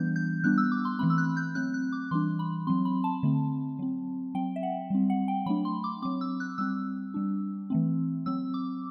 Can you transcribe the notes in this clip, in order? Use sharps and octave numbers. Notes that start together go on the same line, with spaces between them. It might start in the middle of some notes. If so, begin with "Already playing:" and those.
Already playing: E3 G3 B3 D4 G6
G6
G3 B3 D4 F#6
E6
D6
C6
E3 A3 C4 B5
E6
F#6
G6
F#3 A3 C4 F#6
F#6
D6
E3 G3 D4 C6
B5
F#3 C4 C6
B5
A5
D3 A3 C4
F#3 C4
F#3 C4 G5
E5
F#5
G3 C4
F#5
G5
F#3 A3 D4 B5
C6
D6
F#3 C4 D6
E6
F#6
G3 C4 E6
G3 D4
E3 A3 C4
F#3 C4 E6
D6